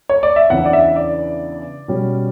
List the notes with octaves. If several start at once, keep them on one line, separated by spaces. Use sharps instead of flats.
C#5
D5
E5
E2 C#3 E3 B3 D4 F#5
D5
E5
D5
B2 G3 C#4